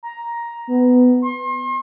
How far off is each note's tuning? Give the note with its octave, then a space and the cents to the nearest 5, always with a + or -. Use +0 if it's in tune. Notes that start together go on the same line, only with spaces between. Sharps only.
A#5 +10
B3 +15
C6 +40